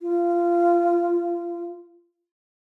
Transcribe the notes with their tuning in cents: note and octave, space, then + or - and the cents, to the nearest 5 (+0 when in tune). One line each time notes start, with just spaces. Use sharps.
F4 -20